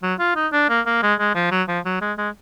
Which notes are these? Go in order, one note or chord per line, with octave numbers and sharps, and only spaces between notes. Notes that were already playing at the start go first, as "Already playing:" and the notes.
F#3
F4
D#4
D4
A#3
A#3
G#3
G#3
F3
F#3
F3
F#3
G#3
G#3